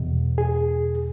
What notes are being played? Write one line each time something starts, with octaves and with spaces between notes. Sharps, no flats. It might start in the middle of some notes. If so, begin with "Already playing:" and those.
Already playing: E2 B2
G#4